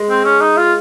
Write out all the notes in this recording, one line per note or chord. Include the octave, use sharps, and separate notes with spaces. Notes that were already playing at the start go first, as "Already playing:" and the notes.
Already playing: G#3
C4
C#4
D#4
F4